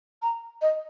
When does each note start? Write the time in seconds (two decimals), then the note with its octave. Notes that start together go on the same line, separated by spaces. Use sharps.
0.22 A#5
0.62 D#5